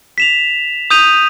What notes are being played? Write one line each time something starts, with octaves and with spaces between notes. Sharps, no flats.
B6 E7 F7
D#6 G6 D#7 F7